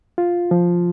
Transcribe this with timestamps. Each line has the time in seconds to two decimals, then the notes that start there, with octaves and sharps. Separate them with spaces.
0.18 F4
0.51 F3